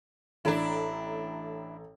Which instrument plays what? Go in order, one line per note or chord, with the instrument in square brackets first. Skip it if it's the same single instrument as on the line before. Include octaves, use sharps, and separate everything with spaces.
[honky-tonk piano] A1 A4 A#5 [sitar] D4 E4